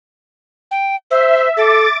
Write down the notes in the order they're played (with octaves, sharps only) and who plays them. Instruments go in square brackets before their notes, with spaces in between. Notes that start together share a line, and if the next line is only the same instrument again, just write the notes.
[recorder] G5
[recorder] C5 [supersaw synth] E5
[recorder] A4 [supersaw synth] D6 A6